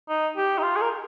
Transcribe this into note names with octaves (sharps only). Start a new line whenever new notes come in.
D#4
G4
D#4
F4
G#4
A#4